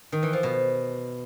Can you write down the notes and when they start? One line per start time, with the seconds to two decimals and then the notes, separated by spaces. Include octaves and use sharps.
0.12 D#3
0.23 E3
0.33 F3
0.43 B2